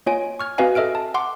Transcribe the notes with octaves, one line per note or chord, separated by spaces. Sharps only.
A#3 F4 C#5 D#5 G#5 D7
C#6 F6 G#6
C4 F#4 B4 D#5 F5 G#5
A4 D#5 E5 F6 D7
A5
F#5 C6 D6